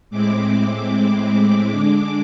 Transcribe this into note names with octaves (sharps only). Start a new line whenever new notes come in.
A2 G#3 C4 E4 D6
D6
D3 G#3 D4